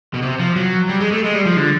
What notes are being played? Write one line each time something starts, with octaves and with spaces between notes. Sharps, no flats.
B2
C3
F3
F#3
G3
G#3
A3
G#3
G3
F3
D3